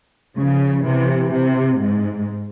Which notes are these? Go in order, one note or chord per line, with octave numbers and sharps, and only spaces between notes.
C#3 F3
C3 E3
C3
G#2